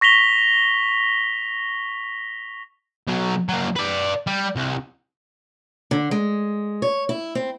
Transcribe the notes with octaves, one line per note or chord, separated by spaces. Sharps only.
C#6 A#6 B6 F7 G7
B2 F#3
F#3 A#3
B4 D5
G3
C2
D3
G#3
C#5
E4
C4